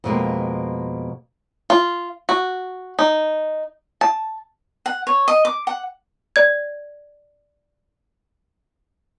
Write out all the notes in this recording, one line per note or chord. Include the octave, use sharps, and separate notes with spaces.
F2 B2 G#3 A#3
F4
F#4
D#4
A5
F#5
C#5
D#5
D6
F#5
D5 G#6